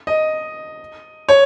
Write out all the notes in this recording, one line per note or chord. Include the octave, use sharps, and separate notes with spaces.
D#5
C#5